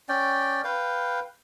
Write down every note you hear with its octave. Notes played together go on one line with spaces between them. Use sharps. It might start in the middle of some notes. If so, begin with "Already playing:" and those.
C#4 D5 G5
B4 F5 G5